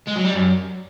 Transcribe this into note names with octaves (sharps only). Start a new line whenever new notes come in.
G#3
F#3
G3
F#2